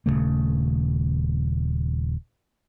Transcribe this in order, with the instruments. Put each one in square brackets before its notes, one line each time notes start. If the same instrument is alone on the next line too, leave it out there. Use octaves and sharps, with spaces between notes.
[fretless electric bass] D#1 E2 C#3 A3